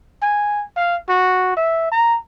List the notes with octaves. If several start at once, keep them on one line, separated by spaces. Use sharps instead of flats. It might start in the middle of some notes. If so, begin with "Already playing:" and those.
G#5
F5
F#4
E5
A#5